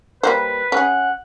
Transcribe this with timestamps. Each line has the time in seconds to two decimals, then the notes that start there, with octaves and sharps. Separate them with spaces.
0.23 G3 A#3 B4 C5
0.72 C#4 G#4 F#5